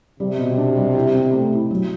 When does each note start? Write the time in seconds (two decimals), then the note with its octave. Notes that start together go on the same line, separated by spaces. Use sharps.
0.20 C3 G3
0.39 B2
0.57 D4
0.77 G3
0.95 E4
1.14 C4
1.33 A3
1.52 E4
1.70 F#3